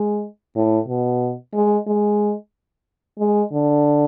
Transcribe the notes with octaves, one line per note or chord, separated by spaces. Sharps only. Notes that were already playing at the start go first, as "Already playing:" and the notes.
Already playing: G#3
A2
B2
G#3
G#3
G#3
D3